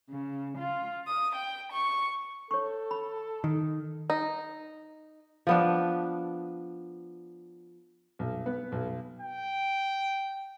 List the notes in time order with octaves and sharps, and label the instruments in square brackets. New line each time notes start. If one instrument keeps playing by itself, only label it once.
[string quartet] C#3
F4
D#6
G5
C#6
[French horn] A4 [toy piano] C#5 C#6
[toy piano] B5
[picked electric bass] D#3
[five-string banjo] D#4
[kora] F3 B3 D4
[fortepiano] B1
B3
B1
[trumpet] G5